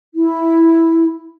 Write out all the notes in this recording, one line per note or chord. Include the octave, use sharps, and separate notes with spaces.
E4